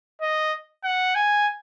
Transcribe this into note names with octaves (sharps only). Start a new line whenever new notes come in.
D#5
F#5
G#5